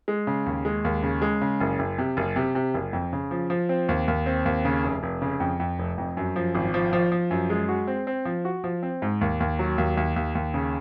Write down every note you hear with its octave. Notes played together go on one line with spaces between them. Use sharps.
G#3
C#3
D#2
G#3
D#2
C#3
G#3
C#3
F#1
F#1
C3
F#1
C3
C3
F#1
F2
C#3
F3
F3
C4
D#2
D#2
C4
D#2
C#3
F1
F1
C#3
F2
F2
F1
F2
F#2
F3
G#1
F3
F3
F3
F#2
G#3
F#4
C4
C4
F3
F#4
F3
C4
G#2
D#2
D#2
F#3
D#2
D#2
D#2
D#2
C#3